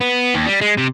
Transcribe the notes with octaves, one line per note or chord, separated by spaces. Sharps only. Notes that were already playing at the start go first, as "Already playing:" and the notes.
B3
D#2
G3
G#3
C3